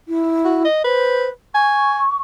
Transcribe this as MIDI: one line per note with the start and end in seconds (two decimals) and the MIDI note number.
0.08 0.64 64
0.45 0.62 66
0.65 0.80 75
0.84 1.30 71
0.84 1.27 72
1.55 2.02 80
1.55 2.20 85